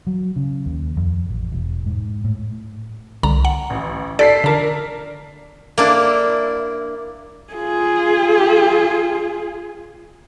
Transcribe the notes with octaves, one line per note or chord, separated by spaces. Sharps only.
F#3
C#3
D#2
F2
A1
E1
G#2
A2
C2 D3 A#5
F#5
A1
A4 D5 B6 C7
D3 D4 A#4 A5
A#3 D4 E4
F4 G#4